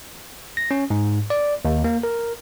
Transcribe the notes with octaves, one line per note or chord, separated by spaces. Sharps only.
A#6
C#4
G#2
D5
D#2
A#3
A#4